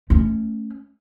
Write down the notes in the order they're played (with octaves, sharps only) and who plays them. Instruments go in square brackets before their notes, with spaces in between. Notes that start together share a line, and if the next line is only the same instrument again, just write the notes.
[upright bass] A3 C#4